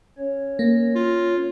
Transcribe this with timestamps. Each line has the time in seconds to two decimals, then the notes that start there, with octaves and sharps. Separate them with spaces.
0.18 C#4 C#5
0.59 A#3
0.95 F4